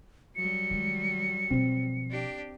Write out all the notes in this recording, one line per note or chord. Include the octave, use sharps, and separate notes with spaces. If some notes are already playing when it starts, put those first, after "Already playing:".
F#3 G3 C#7
D#3 G#3
B2 F3 C4
D4 G4